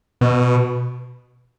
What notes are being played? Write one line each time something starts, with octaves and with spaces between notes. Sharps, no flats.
B2